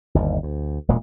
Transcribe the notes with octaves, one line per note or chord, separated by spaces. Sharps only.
G1 D#2
D2
E1 A#2 G#3